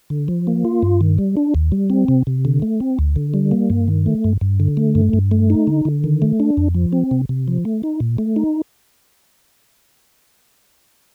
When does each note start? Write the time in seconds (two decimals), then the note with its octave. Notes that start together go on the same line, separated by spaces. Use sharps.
0.10 D3
0.28 F3
0.47 A#3
0.65 F4
0.83 G2
1.01 D#3
1.18 G3
1.37 D4
1.55 D#2
1.72 G3
1.90 C4
2.08 C3
2.27 C3
2.45 D3
2.62 A3
2.80 C4
2.99 D2
3.16 D3
3.34 G3
3.51 A#3
3.70 G2
3.88 D#3
4.06 A3
4.24 G2
4.41 G2
4.60 D3
4.77 A3
4.95 G2
5.13 G2
5.31 A3
5.50 D#4
5.67 D3
5.85 D3
6.04 D#3
6.22 A3
6.40 D4
6.57 F2
6.75 F3
6.93 C4
7.11 C3
7.29 C3
7.48 F3
7.65 A3
7.83 D#4
8.00 A#2
8.18 A3
8.36 D#4